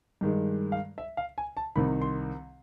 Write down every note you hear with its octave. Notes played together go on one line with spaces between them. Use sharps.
G2 D#3 G#3
F5
E5
F5
G#5
A5
C2 C3 D#3 B5
C6